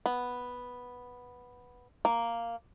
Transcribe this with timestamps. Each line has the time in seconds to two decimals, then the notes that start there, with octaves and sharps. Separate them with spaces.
0.06 B3
2.05 A#3